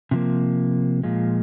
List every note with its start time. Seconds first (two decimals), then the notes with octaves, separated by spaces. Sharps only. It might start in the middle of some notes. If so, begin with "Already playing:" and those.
0.11 C3 F3 A#3
1.03 A#2 F3 G#3